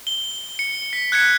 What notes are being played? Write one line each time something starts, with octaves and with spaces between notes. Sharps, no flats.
G7
C#7
B6
F#6 G#6 B6 C#7